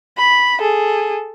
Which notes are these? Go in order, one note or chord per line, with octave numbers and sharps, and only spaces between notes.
B5
G#4 A4